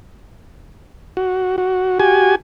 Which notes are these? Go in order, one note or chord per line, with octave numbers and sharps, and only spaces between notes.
F#4
F#4
F#4 G4 G#5